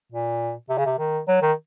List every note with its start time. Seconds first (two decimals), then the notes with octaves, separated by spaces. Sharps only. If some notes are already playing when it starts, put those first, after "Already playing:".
0.12 A#2
0.69 C3
0.78 C#3
0.86 C3
0.99 D#3
1.28 F#3
1.42 D#3